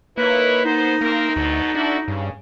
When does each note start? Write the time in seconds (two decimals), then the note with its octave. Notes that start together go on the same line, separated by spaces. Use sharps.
0.18 A#3 D#4 E4 B4 C#5
0.65 B3 D#4 C5
1.01 D2 A#3 C4 A#4
1.36 D2 B2 F#3 A4
1.74 D4 E4 F#4 A4
2.08 G2 C#3